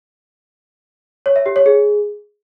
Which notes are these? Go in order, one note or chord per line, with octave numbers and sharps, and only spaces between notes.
C#5
E5
G4
C#5
G#4